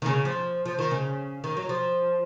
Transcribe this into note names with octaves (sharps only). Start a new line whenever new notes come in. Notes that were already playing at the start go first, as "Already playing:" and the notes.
D#3
C#3
F3
F3
D#3
C#3
D#3
F#3
F3